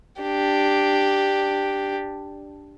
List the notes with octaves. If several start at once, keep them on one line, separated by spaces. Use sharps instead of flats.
D4 G4